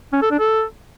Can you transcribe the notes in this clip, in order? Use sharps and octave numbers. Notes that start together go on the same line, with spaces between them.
C#4
A4
D4
A4